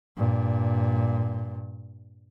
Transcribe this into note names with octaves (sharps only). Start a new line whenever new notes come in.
G2 A#2